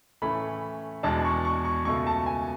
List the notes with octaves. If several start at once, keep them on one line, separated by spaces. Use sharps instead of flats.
A2 E3 A3 C#4 B5
E2 B2 G#3 D4 A5
C#6
C#6
C#6
C#2 B2 A3 C#6
A5
G#5